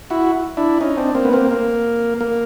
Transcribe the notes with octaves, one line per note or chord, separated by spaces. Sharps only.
E4 F#4
D4 E4
C#4 D#4
C4 D4
A#3 C4
B3
A#3 C4
A#3
A#3